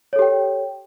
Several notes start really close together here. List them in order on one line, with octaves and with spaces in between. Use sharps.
C#5 A4 G4 G5